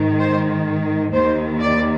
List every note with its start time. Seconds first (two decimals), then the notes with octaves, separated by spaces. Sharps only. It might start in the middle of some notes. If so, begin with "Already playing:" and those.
Already playing: G#2 D#3
0.19 C5
1.13 D#2 D#3 C5
1.60 D5